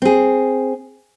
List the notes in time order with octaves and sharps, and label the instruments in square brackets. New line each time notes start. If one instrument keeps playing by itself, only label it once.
[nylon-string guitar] C4 G#4